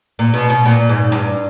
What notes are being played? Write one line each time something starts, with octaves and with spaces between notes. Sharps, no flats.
A#2
B2
B2
A#2
G#2
G2